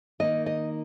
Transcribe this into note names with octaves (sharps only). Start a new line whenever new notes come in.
D#3 A#3 D#4 D#5
D#5